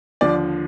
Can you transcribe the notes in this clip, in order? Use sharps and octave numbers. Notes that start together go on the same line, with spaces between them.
D#2 D3 F3 D5